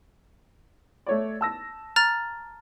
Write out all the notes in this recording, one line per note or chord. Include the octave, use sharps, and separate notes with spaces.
A3 C#5 D5
A5 E6 A#6
A#5 F6 A6